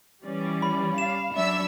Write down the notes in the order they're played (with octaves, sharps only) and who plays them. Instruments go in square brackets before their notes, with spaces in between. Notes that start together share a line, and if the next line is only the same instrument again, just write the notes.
[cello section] E3 [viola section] G3 C#4 D5
[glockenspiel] B5
[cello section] F5 [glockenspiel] E7
[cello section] F#3 D4 [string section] E5 E6